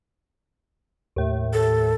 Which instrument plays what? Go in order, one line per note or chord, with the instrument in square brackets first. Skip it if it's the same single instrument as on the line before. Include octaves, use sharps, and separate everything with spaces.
[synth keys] D#2 A2
[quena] A4